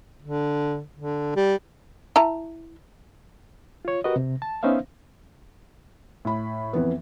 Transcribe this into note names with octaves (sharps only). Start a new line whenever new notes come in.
D3
D3
G3
E4 A5 A#5
F4 C#5
F#4 G4 A#4 B4 D#5
C3
A5
B3 C#4 D#4 C5 E5 F5
A2 B5
F2 E3 B3